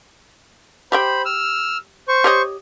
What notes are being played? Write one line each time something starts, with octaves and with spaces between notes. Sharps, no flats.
G4 C5 E5 G5 B5
E6 F6
C5 C#6
G4 C#5 D#5